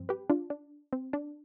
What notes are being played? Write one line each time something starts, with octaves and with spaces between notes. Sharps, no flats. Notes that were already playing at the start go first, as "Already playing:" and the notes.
Already playing: G2 F3 C4
G4 B4
D4 F4
D4
C4
D4